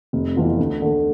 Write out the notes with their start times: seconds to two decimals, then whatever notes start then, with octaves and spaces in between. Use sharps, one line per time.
0.13 F1
0.36 F2 E3 B3 F4
0.59 D2
0.82 D3 A3